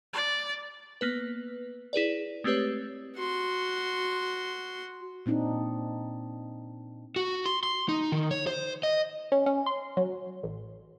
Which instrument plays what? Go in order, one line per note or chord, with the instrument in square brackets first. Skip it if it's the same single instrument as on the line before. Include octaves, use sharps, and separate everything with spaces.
[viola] D5
[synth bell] A#3 B3 B4
E4 G#4 B4 D5
G#3 A3 C4 G4 B4 C#5
[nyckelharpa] F#4 C6
[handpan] A#2 C4 D4 D#4
[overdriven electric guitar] F#4
C6
C6
D#4
D#3
C#5
C5
D#5
[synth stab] C#4
C#4
C6
F#3
A1